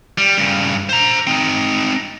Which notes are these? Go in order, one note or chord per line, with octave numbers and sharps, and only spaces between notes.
G3
G2 C#3
C5 A#5
C4 D#4